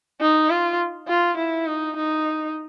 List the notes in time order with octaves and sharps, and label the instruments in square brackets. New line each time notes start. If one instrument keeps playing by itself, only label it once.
[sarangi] D#4
F4
F4
E4
D#4
D#4